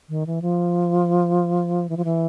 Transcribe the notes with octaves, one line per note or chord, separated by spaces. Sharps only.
D#3
E3
F3
E3
F3
E3